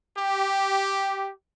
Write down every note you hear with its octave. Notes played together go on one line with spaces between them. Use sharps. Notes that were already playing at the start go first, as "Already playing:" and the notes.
G4